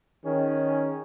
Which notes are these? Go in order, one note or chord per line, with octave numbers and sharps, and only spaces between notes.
D#3 C#4 G#4